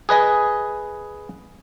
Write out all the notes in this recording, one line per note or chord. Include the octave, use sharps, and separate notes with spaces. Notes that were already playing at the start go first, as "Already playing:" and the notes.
G#4 B4 D#5 G#5